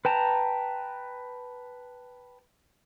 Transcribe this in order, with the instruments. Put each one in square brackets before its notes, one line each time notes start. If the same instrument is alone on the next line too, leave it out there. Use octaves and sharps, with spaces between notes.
[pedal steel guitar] B4 G5 A5 A#5